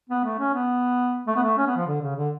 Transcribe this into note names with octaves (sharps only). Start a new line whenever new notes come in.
B3
A3
C#4
B3
A3
B3
A3
C#4
B3
F3
D3
C#3
D3